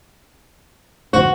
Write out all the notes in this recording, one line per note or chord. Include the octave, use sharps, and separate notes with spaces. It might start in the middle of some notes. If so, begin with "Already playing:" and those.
F2 D3 F#4 C5